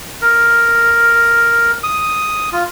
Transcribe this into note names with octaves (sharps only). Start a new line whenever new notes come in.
A#4
D#6
F4